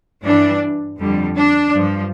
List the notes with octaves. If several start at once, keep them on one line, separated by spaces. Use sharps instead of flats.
G2 E3 G3 D4
F2 D3 G3
D4
G2 F3